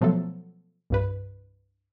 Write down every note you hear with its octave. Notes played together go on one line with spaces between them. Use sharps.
B2 F3 F#3 A3 B3 A4
C2 G2 B4